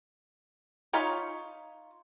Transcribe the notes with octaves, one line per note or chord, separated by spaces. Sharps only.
D#4 F4 C#5 B5